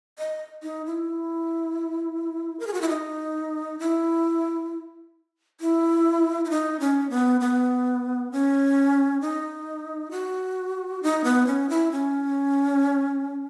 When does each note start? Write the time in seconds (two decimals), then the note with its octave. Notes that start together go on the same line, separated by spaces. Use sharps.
0.18 D#5
0.63 D#4
0.86 E4
2.60 A#4
2.67 G#4
2.74 F#4
2.81 E4
2.89 D#4
3.79 E4
5.61 E4
6.45 E4
6.50 D#4
6.80 C#4
7.10 B3
7.40 B3
8.32 C#4
9.21 D#4
10.11 F#4
11.03 D#4
11.24 B3
11.47 C#4
11.69 E4
11.92 C#4